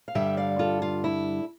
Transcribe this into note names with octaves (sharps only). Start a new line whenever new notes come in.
F5
G2 D3 G3 E5 G5
D5 F5
F4 A4
F4
E4